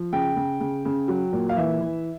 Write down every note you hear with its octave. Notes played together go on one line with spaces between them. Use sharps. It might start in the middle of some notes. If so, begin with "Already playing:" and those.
Already playing: F3
C#3 G5
C#3
C#3
C#3
F#3
A#2
F5
E3 E5
E3